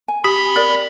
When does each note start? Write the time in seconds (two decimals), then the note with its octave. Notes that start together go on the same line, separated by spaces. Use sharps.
0.08 G#5
0.24 C4 G4 B5 B6
0.56 A#4 D5